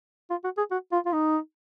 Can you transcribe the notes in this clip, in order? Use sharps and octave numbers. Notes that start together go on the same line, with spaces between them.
F4
F#4
G#4
F#4
F4
F4
D#4